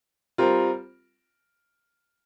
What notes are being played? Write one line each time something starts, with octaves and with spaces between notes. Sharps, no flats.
G3 C4 F4 A#4